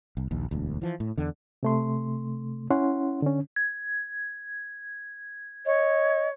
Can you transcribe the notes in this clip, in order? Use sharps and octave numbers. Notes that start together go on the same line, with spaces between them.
C2
A#1 D#2
E1 D2
E3 F3
A2
E2 D3
C3 A3 C6
C#4 E4 F#5 C6
D3 C#4
G#6
C#5 D#5